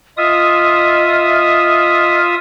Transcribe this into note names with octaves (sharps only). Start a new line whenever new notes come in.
F4 D#5 E5 D#6